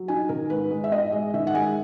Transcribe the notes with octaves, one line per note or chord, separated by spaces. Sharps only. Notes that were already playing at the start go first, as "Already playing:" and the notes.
Already playing: F#3
D#4 G#5
D#3 A#4
G#2 B4
G#3
E5
G#2 D#5
G#3
D#3 E5
F#5
G#3 G#5